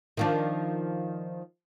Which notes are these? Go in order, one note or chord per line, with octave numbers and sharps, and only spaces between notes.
D#3 F3 D4